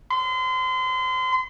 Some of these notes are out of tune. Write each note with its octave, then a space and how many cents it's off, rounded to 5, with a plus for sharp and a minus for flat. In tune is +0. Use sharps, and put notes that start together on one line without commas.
C6 -35